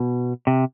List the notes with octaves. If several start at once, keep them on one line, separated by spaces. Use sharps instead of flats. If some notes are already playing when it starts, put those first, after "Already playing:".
Already playing: B2
C3